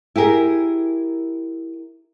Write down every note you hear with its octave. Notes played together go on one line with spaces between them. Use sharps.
E4 G4 G#4 A#4